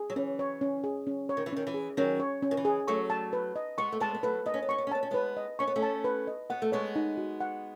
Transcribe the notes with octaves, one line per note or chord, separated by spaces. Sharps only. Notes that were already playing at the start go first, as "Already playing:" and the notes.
Already playing: G#4
F#3
E3 C#4
C#5
C#4
G#4
C#4
C#5
D#3
E3
D#3 C#4
E3
G#4
D#3 F#3 C#4
C#5
C#4
D#3
E3
G#4
F#3 A3 C#6
A5
B4
D#5
G#3 B3 C#6
A3
G#3 B3 A5
B3
F#3 A3 B4
B3 D#5
C#4
B3
C#4 C#6
B3
C#4
B3 A5
C#4
G#3 B3 B4
D#5
C#4 C#6
B3
A3 C#4
A5
B4
D#5
B3 F#5
A3
G#3 B3 C#5
D#4
F#4
F#5